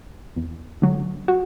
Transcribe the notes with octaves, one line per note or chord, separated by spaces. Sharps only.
E2
D3 F#3
F#4